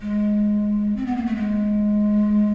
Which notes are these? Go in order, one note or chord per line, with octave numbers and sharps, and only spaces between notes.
G#3
C4
B3
A#3
A3
G#3